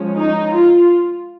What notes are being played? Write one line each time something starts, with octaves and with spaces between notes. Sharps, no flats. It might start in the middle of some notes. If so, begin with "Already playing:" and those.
Already playing: F3 G#3 C#4
D#4
F4